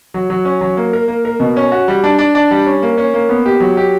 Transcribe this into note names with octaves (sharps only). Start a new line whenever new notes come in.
F#3
F#3
C#4
F#3
A#3
A#4
A#3
A#4
B2
C#4
F#4
G3
D4
D4
D4
G3
C#4
A#3
C#4
A#3
B3
G4
F#3
G4